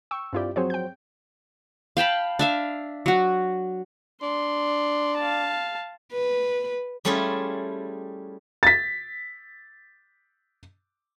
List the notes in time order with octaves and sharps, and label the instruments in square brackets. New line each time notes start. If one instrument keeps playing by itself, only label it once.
[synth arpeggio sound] G5 C#6 [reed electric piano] E6
[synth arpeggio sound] G2 E4 G4 [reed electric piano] C4 F4 D5
[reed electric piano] F3 F#3 C5 [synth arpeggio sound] C4 G#4 C#5
[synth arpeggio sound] G5 G6
[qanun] F5 G5 A5 B5
D4 E5 F5
F#3 F#4
[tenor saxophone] D4 [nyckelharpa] C6
[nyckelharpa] F5 A5
[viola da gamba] B4
[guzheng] G3 A3 C#4 E4 F4 G#4
[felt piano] A6 B6